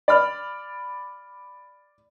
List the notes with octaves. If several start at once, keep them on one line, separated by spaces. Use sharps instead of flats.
D5 B5 F6